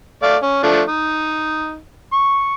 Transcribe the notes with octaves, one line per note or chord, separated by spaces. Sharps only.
A3 D5 F5
C#4
F3 A3 D4
D#4
C#6